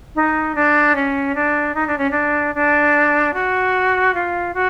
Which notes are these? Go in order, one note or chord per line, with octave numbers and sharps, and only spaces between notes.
D#4
D4
C#4
D4
D#4
D4
C#4
D4
D4
F#4
F4
F#4